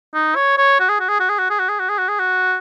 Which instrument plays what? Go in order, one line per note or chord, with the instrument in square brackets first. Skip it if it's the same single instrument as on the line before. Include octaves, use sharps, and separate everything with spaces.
[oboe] D#4
C#5
C#5
F#4
G#4
F#4
G#4
F#4
G#4
F#4
G#4
F#4
G#4
F#4
G#4
F#4
G#4
F#4